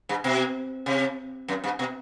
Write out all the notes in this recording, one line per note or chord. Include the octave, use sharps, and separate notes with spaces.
G2
B2
C3
F#2
G2
B2